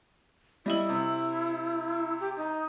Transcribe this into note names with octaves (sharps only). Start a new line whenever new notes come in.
G3 E4 D#5 F#7
C3
G4
D#4